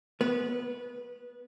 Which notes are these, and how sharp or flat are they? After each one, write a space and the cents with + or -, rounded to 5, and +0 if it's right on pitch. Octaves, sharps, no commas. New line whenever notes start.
B3 +0 B4 -25